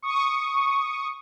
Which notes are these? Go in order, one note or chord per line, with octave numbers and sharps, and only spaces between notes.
C#6 D#6